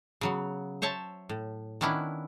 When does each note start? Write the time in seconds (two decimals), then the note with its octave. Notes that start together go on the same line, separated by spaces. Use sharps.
0.21 C#3 F#3 B3
0.82 C5 C#5 E5 A5
1.29 A2
1.81 D#3 B3 C#4 D4 E4